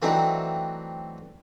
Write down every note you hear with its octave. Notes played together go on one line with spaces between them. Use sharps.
E3 F#3 A3 C4 D4 D#4